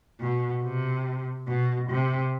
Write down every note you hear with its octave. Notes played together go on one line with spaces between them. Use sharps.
B2
C3
B2
C3